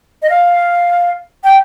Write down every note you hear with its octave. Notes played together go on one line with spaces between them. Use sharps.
D#5
F5
G5